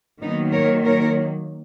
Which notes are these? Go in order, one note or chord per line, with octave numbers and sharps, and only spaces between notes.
D#3 F#3 A#3 B3 D#4
A#4 C#5
A#4 C#5